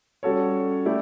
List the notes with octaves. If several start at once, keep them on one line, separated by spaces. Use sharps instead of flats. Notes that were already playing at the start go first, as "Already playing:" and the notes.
G3 C#4 F#4 A4 C#5
A3 E4 G4 D5